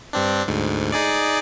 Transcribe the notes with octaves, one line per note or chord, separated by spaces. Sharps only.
G2 C4 D4
D2 G#2
D#4 G#4 D5